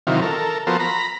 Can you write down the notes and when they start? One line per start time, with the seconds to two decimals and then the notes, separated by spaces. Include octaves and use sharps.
0.07 C3 D#3 E3 F#3 F4
0.22 A4 A#4
0.67 F3 B3 F#4 A4 A#4 C5
0.80 A#5 B5